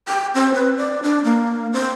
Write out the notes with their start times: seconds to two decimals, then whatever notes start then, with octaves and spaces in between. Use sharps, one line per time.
0.08 G5
0.35 C4
0.54 B4
0.78 D5
1.03 D4
1.24 A#3
1.73 C4